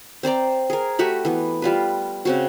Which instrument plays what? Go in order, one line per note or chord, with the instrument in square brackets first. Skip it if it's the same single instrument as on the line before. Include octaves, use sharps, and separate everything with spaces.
[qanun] C4 C5 D5 A#5
G#4 A#4
A3 F#4 G4 B5
E3 B3
G3 F4 B4
C#3 C4 F#4